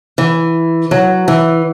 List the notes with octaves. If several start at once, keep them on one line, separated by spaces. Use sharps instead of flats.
E3
F#3
E3